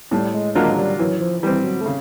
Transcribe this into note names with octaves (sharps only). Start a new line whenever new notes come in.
A2 G3
G#3
F#3 G#3 A#3 D4 F4
G3
E3 F#3
F3
E3 G3 C4
F#3
A3
C#3